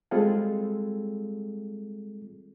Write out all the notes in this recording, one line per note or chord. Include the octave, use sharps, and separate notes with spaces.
G3 G#3 C4 F4 G#4 A4